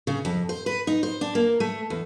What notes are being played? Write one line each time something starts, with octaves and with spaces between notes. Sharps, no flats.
C#3
F2
C5
B4
D#4
C5
D4
A#3
A3
E2